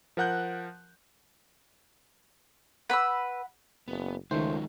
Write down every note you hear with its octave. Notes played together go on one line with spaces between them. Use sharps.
F3 A#4 F#5 F#6 G6
B4 F#5 B5 E6
F#1 B3
C#2 D#3 F3 F#3 G#3 A3 C5